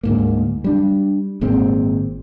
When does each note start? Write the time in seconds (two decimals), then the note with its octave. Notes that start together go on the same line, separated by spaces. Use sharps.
0.03 D2 G#2 A#3
0.64 G3 D4
1.41 G#1 A#2 G#3 C4